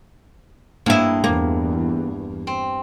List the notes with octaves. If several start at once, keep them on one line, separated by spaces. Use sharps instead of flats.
G2 A#3 E4 D#5
E2 A#3
C4